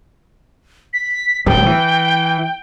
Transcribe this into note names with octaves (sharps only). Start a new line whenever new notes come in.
B6
D1 G3 G5
E3